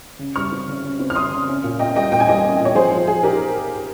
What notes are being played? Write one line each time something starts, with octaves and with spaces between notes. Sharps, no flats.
C#3
G3 C#6 F6
C4
C#3
C#3
C4
F6
C#3 C6 D#6
C#3
C#4
A#2
A#2 D#5 G5
G3 D#5 G5
A#2 G5
G#5
G3 D#5 G5
C#4
A#2
C#5
F3 G#4 C5
F3
F3 G#4
D#4 G4 A#4